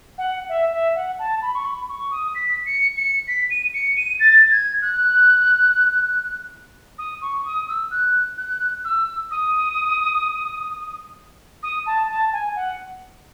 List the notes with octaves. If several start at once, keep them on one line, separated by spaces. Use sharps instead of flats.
F#5
E5
E5
F#5
A5
B5
C#6
B5
C#6
D#6
B6
C#7
C#7
B6
D#7
C#7
D#7
A6
G#6
F#6
D#6
C#6
D#6
E6
F#6
F#6
E6
D#6
D#6
A5
A5
G#5
F#5